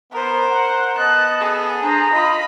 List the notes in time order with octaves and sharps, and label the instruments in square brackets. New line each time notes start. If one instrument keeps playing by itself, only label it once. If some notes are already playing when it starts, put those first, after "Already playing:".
[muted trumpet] B3 [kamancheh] A#4 C5
[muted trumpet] F#5
[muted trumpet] B3 [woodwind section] D#5 A5 [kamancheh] F#6
[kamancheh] G#4 A4
[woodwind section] D4 C5 [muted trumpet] A#5
[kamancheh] F4 B5 [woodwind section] D#5